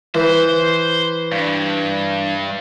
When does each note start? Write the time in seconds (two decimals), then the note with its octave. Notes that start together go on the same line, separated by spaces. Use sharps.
0.15 E3 C5
1.32 G2